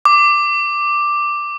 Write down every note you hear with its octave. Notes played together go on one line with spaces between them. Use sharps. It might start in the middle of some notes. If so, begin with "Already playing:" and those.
D6